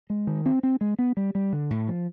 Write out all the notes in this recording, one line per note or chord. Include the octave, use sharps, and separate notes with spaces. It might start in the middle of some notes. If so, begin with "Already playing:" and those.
G#3
D#3
C4
C4
G#3
B3
G3
G3
D3
A2
F3